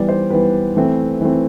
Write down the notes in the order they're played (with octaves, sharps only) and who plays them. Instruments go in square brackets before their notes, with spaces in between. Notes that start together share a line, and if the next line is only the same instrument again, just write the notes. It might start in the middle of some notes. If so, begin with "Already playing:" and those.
Already playing: [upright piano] E3 G3 B3 D5
C5
E3 G3 B3 B4
E3 A3 C4
E3 A3 C4